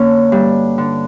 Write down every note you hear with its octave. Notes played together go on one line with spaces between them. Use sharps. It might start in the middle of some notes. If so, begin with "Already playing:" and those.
Already playing: D3 A#3 C#4
G2
D3